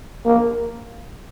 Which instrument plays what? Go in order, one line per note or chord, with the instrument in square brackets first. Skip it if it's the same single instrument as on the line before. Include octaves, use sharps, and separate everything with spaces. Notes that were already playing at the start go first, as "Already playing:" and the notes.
[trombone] A#3